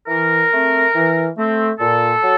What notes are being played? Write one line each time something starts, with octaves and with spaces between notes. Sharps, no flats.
E3 A#4
A3 C4
E3
A3 C4
A#2 A4
F#3